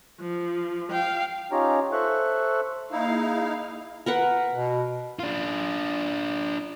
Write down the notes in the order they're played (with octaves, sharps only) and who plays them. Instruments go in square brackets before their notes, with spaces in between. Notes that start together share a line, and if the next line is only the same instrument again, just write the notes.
[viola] F3
F5 G5
[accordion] C#4 D#4 F4 G4 C#5 A#5
A4 C5 E5 C#6 F#6
[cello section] A#3 G#4 [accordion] D#4 E4 [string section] F5
[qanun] A#4 B4 F#5
[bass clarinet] B2
[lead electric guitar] D4 F4